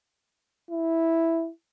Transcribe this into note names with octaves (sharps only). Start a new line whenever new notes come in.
E4